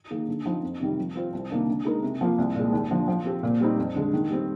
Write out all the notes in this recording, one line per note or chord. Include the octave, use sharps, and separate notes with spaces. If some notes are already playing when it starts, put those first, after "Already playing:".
D#3 A#3 D#4 G#4
D3
F3 C4 D#4
F2
C3 D#3 G3
F3
C4 F4 C5
C2
C3 D#3 A#3 D4
D3
G#3 D#4 A#4
C3
F3 A#3 F4
C2
A#2 G#3
D#2
D3 F3
F3
C4 G4
A#2
G3 C4 D#4
F2
D3 G#3
D#3
G3 C4